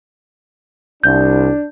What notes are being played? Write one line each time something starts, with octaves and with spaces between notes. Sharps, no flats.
C2 D4 G6